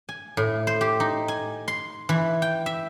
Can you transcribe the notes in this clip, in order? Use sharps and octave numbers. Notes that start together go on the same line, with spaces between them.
G#5
A2
C5
G4
D#4
G#5
C6
E3
G5
E5